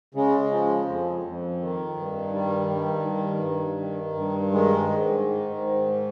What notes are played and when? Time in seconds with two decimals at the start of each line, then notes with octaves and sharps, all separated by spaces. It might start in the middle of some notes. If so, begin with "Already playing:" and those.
0.14 C#3 G#3
0.51 F3
0.88 F2
1.23 F2
1.61 D#3
1.97 G2
2.33 D#3 G3
2.70 G2
3.06 D#3
3.43 G2
3.79 D#3
4.15 G2
4.52 D#3 G#3
4.89 G#2
5.25 D#3
5.61 G#2